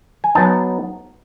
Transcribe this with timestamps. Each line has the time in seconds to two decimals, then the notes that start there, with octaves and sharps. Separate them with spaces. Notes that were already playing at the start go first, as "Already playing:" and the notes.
0.24 G#5
0.35 F#3 B3 D#4 A5